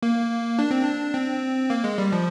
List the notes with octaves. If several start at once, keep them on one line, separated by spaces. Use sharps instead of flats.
A#3
D4
C4
D4
C4
A#3
G#3
G3
F3